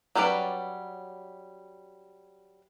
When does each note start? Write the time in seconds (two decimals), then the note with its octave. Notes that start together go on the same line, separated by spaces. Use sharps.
0.15 F#3 G3 C#4 B4 D5